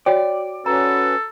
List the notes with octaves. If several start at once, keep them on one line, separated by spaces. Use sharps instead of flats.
F#4 C#5 D5 G5
C#4 F#4 A4 B4 A#5